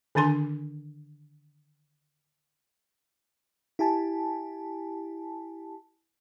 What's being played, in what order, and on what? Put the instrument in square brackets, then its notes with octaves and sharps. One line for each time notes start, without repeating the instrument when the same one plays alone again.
[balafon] D3 D#3 D4 G#5 C6
[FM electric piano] E4 G4 G#5 A5